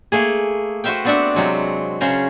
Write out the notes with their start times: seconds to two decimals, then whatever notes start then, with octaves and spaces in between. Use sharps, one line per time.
0.12 A3 A#3 G#4
0.84 F#4 B4 C5 E5 F5 G5
1.05 B3 C4 D4 D5 E5 F#5
1.35 C3 F#3 G#3
2.01 C#3 C#4 A#4 C5